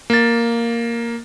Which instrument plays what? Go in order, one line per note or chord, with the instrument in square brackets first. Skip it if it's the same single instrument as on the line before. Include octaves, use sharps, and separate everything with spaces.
[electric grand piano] A#3 A6